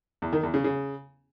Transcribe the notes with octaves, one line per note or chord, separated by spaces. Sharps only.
E2
D#3
E2
C#3
C#3